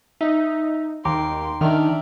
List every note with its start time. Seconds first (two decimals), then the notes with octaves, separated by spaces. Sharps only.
0.21 D#4 E5
1.05 D#2 G5 A#5 C6 D6
1.61 D#3 D4 E5 F6